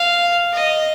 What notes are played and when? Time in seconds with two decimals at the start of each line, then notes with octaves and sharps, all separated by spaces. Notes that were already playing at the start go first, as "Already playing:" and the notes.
Already playing: F5
0.53 D#5